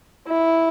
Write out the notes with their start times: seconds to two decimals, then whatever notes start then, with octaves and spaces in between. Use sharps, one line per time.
0.28 E4